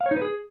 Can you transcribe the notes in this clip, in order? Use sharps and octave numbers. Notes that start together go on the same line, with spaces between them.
F5
C#5
D#4
B4
G#4